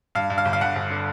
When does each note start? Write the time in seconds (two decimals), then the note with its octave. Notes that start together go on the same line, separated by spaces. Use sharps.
0.15 G2 F5
0.30 G2
0.38 F5
0.45 G1
0.53 F5
0.61 G1 F#5
0.76 G1
0.90 D3